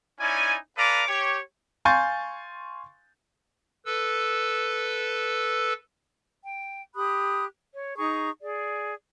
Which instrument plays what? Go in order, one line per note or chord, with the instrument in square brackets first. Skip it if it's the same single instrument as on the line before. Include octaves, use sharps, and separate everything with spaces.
[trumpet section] C#4 D#4 E4 D5 G#5
A4 B4 D5 F5 A#5 D6
G4 C#5
[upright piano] F5 G#5 C6 C#6 G6 A6
[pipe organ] A4 B4 E6
[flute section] G5
G4 B5 D#6 F#6
C#5
D#4 G#4 A#5 C#6
G#4 D5